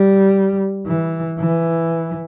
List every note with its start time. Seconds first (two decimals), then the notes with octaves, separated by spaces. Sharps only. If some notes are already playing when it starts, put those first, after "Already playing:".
Already playing: G3
0.87 E3
1.39 E3